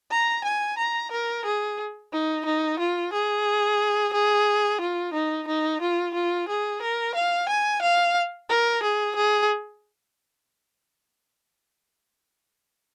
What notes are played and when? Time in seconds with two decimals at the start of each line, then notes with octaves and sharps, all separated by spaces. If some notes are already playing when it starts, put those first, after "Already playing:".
0.11 A#5
0.44 G#5
0.78 A#5
1.12 A#4
1.45 G#4
2.13 D#4
2.46 D#4
2.79 F4
3.13 G#4
4.13 G#4
4.81 F4
5.14 D#4
5.47 D#4
5.81 F4
6.14 F4
6.48 G#4
6.82 A#4
7.15 F5
7.49 G#5
7.82 F5
8.50 A#4
8.83 G#4
9.16 G#4